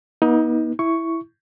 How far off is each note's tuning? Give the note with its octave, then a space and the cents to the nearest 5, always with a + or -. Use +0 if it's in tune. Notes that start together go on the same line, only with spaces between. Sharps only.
B3 -40 D#4 +25
E4 +0 C#6 +5